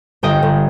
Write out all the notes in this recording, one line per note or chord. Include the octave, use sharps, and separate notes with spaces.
G1 D#5 G5
G1